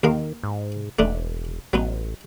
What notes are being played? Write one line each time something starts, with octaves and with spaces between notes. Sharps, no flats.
D#2 D#3 A#4 F5
G#2
E1 A3 D4 D#4
A1 F#3 B3 D#4